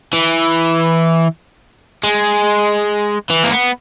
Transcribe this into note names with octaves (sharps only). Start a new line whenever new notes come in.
E3
G#3
E3
A#3
B3